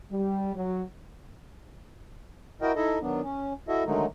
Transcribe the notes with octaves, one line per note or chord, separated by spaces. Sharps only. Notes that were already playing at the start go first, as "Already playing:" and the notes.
G3
F#3
E4 F#4 A#4 D#5 G5
D#4 E4 A4 D#5 E5
D#3 F#3 B3 D4
C#4
E4 F#4 A4 D#5 E5
D3 D#3 F#3 G#3 A3 D#4